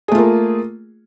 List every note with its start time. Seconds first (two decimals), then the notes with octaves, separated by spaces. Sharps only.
0.08 G#4
0.12 A3
0.15 F4
0.18 A#3